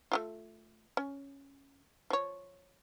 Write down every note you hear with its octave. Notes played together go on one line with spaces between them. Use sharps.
A3 E4 F4
C#4
F3 C#5